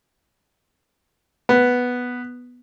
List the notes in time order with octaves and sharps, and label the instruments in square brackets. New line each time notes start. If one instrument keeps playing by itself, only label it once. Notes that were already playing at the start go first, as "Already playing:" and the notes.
[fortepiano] B3